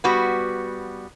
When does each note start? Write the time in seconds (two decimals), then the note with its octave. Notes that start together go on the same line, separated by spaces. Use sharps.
0.04 G3 B3 F#4